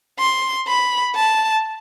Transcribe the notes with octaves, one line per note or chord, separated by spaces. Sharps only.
C6
B5
A5